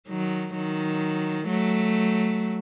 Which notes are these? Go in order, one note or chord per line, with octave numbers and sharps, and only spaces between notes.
D#3 F#3
D#3 F#3
F#3 A3